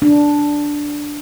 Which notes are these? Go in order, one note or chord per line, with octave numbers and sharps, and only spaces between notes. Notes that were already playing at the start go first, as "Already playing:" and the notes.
D4